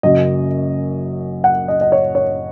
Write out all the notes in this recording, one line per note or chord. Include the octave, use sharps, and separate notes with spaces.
F#1 F#2 F#3 D#5
F#5
D#5
D#5
C#5
C#5